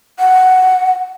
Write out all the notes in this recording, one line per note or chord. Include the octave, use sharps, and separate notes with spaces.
F#5